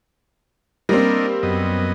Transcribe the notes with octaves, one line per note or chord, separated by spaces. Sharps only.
G3 A#3 C4 D4 A#4 D#5
F#2 B3 D#5